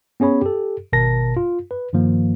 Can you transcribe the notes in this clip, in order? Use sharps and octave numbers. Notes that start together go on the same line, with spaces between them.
B3 C#4 G#4 C#5 B5
G4 A4
G#1 B2 A#4 A5 A#6
F4
B4
G2 D#3 F3 A#3